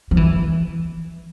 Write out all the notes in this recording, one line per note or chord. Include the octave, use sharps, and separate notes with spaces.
F3
E3